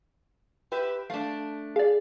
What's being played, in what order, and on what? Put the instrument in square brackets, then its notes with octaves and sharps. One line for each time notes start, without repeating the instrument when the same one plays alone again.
[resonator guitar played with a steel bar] G4 B4 E5
[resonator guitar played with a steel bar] A3 D4 [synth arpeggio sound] F5
[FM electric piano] G#4 [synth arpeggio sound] D5 F5